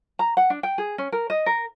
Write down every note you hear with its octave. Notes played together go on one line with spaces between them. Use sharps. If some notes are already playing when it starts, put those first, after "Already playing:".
A#5
F#5
D4
G5
G#4
C#4
A#4
D#5
A#4